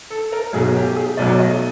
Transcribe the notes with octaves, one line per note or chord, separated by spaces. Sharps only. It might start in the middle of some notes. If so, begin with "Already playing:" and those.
A4
A#4
B1 B2 F#3 G#4
G4
G#4
B1 B2 F#3 D5
D#5